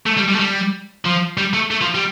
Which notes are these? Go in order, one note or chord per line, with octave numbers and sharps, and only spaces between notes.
A3
G3
G3
A3
G3
F3
G3
A3
A3
F3
G3